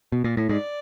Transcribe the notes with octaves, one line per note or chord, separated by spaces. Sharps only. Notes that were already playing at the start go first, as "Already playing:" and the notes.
B2
A#2
A2
G#2 D5